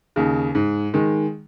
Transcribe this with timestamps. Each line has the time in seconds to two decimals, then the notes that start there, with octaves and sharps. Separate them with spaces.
0.16 D#2 C#3
0.55 G#2
0.94 D#3 G#3